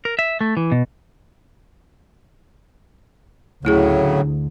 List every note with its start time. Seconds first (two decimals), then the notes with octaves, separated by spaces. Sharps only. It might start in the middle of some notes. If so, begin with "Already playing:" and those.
0.05 A#4
0.19 E5
0.41 A3
0.57 E3
0.72 B2
3.65 D2 A2 C#3 F#3 A3 E4 G#4